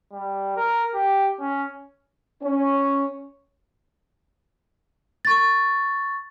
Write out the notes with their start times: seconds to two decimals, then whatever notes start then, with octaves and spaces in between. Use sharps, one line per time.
0.13 G3
0.56 A#4
0.94 G4
1.40 C#4
2.42 C#4
5.25 C#6 A6